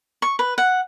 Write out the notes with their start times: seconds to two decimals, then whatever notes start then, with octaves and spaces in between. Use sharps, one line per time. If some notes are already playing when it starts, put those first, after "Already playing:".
0.22 C#6
0.39 B4
0.58 F#5